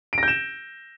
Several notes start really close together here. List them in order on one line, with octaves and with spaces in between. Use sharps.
D7 A#6 G6 E7